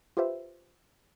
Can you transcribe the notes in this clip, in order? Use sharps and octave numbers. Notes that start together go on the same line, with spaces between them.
F4 G4 B4 C5 E5